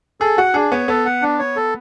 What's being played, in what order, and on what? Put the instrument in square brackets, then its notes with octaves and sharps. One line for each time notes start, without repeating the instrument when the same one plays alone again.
[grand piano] G#4 [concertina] A4
[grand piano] F#4 [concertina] F#5
[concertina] D4 [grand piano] G#4
[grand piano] B3 [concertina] C#5
[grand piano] B3 [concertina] A4
[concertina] F#5
D4
C#5
A4